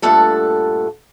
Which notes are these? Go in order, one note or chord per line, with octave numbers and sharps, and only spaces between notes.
G2 A#2 A3 A4 F#5 A5